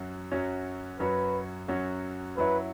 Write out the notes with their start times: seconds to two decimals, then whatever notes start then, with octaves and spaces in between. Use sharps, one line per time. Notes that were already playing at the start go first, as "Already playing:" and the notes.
Already playing: F#2 F#3 C#4 F#4 C#5
0.31 F#2 F#3 C#4 F#4 C#5
0.99 F#2 F#3 C#4 F#4 B4 C#5
1.68 F#2 F#3 C#4 F#4 C#5
2.37 F#2 F#3 E4 B4 C#5 E5